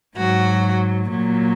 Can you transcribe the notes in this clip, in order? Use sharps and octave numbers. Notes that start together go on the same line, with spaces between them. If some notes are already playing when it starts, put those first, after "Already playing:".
G#2 F#3 F#4
A#2 F#3